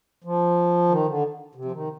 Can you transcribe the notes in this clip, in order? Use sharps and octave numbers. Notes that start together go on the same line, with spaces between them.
F3
D#3
D3
C3
F3
D#3